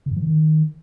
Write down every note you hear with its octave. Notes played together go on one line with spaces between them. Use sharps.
C#3
G#2
F3
D3
D#3